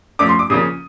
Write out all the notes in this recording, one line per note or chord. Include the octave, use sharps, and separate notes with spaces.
F3 A3 C#4 D6
C6
D6
C#3 F3 A#3 C#4 D#6